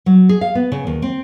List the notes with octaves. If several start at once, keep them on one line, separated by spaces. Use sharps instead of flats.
F#3
G#4
F5
B3
C#3
D#2
C4